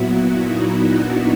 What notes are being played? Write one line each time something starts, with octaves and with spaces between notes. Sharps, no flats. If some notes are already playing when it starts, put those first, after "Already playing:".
Already playing: A#2 F#3 B3 E4 F#4
D#4
D4